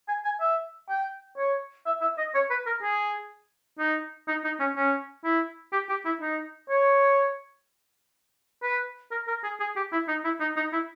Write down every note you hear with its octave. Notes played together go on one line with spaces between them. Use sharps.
G#5
G#5
E5
G5
C#5
E5
E5
D#5
C#5
B4
A#4
G#4
D#4
D#4
D#4
C#4
C#4
E4
G4
G4
E4
D#4
C#5
B4
A#4
A#4
G#4
G#4
G4
E4
D#4
E4
D#4
D#4
E4